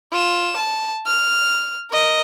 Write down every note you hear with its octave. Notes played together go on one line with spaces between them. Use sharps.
F4 E7
A5
F6
A#4 D#5